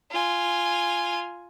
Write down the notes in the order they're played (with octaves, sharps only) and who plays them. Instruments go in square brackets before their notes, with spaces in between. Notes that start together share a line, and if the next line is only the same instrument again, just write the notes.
[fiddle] F4 G#5